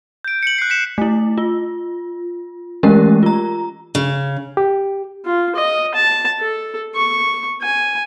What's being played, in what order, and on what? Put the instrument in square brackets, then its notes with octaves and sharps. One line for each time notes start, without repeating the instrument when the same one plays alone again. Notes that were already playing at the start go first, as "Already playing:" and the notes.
[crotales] G6 D7
C#7 F#7
F#6 C7
B6 C#7 E7
[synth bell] A3 E4
F4
E3 G#3 A3 C#4 G4 A#4
F4 A#5
[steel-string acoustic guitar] C#3
[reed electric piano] G4
[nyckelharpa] F4
D#5
A5
A4
C#6
G#5